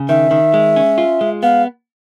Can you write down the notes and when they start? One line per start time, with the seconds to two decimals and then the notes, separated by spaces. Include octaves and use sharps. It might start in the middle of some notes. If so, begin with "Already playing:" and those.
Already playing: C#3
0.09 D#3 E5
0.31 D#3
0.54 G#3
0.76 C#4
0.98 F4
1.21 G#3
1.43 B3 F5